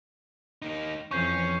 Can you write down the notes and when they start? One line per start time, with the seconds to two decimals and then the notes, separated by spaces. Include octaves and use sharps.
0.62 A#3 D#4
1.11 F2 E3 C#4 C#6 G6 C7